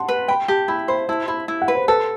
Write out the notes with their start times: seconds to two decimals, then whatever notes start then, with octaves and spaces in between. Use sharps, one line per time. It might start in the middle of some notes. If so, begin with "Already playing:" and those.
Already playing: F#5 A5 C6
0.08 B4
0.28 G5 B5
0.48 G4 A5
0.68 E4 B5
0.88 C5 B5
1.09 E4 A5
1.28 E4 B5
1.48 E4
1.62 F#5
1.68 B4
1.75 C5
1.88 A4 B4